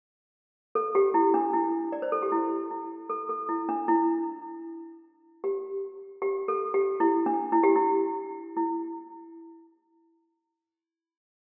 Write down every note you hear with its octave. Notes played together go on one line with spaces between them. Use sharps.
A4
G4
E4
D4
E4
D5
C5
A4
G4
E4
E4
A4
A4
E4
D4
E4
G4
G4
A4
G4
E4
D4
E4
G4
E4
E4